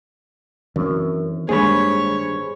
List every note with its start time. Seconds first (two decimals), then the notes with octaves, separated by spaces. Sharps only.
0.76 F#2 D#3 E3 C4
1.49 G2 D#3 G#3 A#3 G#4 C5 C#5 B5